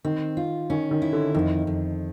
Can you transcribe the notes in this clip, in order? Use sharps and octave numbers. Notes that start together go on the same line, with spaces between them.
D#3 C4
F4
D#3 C#4
D#3
E4
D3
F2 D#3
F2